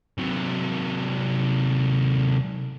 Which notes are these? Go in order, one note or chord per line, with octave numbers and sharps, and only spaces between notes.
C3 F#3